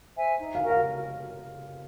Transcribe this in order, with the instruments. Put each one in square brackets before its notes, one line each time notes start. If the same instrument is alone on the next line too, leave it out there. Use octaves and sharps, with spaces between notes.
[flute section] C5 E5 G#5
D#4
[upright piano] F5
[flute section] F#4 A#4
[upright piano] F5